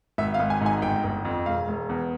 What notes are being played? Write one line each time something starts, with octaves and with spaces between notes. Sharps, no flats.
G#1 E5
F5
G#1
G#5
G#2 G#5
G1 G5
G1
F2
E1 F5
E1
E2